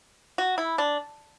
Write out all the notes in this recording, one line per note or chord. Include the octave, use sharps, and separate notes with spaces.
F#4
E4
D4